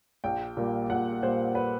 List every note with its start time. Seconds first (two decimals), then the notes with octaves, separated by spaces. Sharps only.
0.24 A#1 G5
0.57 A#2 G3 A#3
0.90 A#1 F#5
1.23 A#2 G3 A#3 C5
1.55 B4